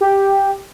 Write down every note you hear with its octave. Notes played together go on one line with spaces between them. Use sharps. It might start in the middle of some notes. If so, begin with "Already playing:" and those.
G4